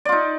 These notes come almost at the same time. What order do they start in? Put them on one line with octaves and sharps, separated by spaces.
D5 F4 D#4